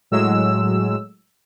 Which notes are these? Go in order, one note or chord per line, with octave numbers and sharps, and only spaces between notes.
A2 F#3 G#3 E6